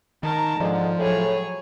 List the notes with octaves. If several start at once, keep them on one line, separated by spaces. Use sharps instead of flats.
D#3 A#4 A5 A#5
G#2 D3 F3 G#3
A2 F#3 G#4 C#5